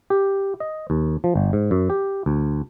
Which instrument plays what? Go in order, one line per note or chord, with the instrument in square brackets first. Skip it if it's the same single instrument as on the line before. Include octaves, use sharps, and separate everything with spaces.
[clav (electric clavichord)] G4
D#5
D#2
F3
G1
G#2
F#2
G4
D2